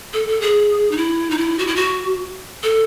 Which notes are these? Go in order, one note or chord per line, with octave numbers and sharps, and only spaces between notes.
A4
A4
G#4
D#4
E4
D#4
E4
F#4
E4
F#4
A4